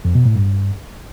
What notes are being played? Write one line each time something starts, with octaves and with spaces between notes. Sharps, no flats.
F2
B2
A2
G2